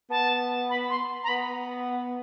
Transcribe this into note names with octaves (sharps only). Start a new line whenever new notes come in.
B3 A5
B5
C6
A#5
B3 B5